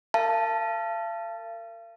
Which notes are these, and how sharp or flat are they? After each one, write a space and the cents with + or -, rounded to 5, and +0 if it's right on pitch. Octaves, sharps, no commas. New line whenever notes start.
A#4 -35 F5 -40 A5 +0